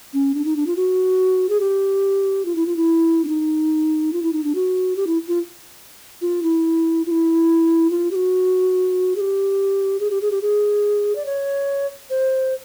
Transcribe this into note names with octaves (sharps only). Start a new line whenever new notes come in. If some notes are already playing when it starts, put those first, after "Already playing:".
C#4
D4
D#4
D4
F4
F#4
G#4
G4
F4
E4
F4
E4
D4
D#4
F4
E4
D#4
D4
F#4
G4
E4
F4
F4
E4
F4
E4
F4
G4
F#4
G#4
G4
G#4
G4
G#4
G4
G#4
D5
C#5
C5